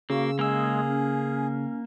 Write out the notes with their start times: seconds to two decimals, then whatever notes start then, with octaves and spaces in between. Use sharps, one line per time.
0.10 C#3 A#3 F#4 E6
0.39 G#3 A#3 G#4 E6
0.88 C#4